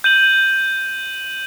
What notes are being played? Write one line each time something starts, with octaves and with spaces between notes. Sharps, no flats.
G6 D#7 F#7